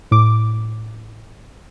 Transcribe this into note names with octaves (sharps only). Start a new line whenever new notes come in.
A2 D6